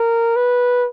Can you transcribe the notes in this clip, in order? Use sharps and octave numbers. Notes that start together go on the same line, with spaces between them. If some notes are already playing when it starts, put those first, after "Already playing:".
Already playing: A#4
B4